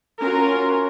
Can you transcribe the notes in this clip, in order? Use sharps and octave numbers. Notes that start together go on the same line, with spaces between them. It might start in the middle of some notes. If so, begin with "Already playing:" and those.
C#4 F4 F#4 A#4